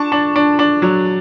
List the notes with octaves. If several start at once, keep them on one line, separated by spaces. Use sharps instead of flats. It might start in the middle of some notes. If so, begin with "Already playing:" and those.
Already playing: D4 A5 C#6
D4
D4
D4
F#3